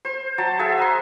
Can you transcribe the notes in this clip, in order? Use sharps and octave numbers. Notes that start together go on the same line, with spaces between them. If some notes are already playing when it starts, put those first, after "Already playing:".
C5
F#3 A5
G#4 E5 F#5
G#5 A#5 C6